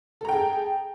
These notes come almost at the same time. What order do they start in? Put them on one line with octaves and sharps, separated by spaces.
A4 A#5 G5 G#4